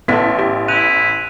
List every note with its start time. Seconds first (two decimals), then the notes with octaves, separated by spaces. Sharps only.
0.08 A1 B3 A4 B6
0.39 G4
0.68 E4 F#6 D#7 F7